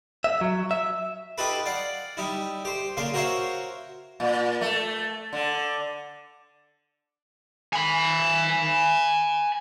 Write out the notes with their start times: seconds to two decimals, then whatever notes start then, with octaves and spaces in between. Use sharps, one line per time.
0.24 E5
0.41 F#3
0.71 E5
1.38 D#4 F4 G4 A4 B4 B5
1.66 D5 F5 F#5
2.17 G3 D#4 E4
2.65 G4 C5
2.97 C#3 A#3 D4 F5 C6
3.14 F#4 A#4 C5 C#5 E5 F5
4.20 A#2
4.61 A3
5.33 D3
7.73 G#5 B5